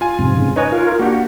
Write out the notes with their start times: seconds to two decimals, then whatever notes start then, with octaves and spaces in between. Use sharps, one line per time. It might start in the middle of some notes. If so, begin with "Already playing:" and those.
0.01 F4 G#5
0.19 F2 G#2 C3
0.37 G#2 C#3
0.56 D#4 B4 C#5 D#5 G#5
0.72 F4 A#4
0.99 A#3 D4 F#4 G4